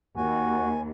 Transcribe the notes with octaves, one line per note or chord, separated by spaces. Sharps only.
D#2 F#4 G#5